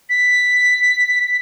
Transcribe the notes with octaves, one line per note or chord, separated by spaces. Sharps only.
B6